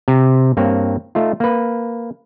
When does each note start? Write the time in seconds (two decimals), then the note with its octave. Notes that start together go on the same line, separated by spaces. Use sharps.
0.08 C3
0.57 G2 A#3 C4 C#5
1.15 A3 D#4 F4
1.40 A#3 B4